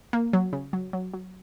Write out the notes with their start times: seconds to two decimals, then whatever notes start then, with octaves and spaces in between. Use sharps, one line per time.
0.13 A#3
0.33 F#3
0.53 C#3
0.73 F#3
0.93 F#3
1.13 F#3